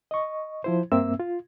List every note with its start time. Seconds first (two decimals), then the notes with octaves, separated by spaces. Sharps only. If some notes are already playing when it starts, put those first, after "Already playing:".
0.11 D#5 C#6
0.64 F3 E4 C5
0.92 G2 A#3 C4 E5 E6
1.20 F4